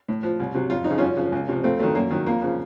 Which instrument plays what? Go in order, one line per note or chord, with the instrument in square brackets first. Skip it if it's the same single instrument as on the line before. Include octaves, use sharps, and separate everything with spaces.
[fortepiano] A2
F3
C2
C3 F#3
F2 F4
F3 D#4
C#3
F#2 C#4 F4
C#3 F3
C#2
C3 F3
F2 A3 C4
D#3 F#3 A3
F#2 A#3
D#3 F#3
F2 A#3
C#3 F3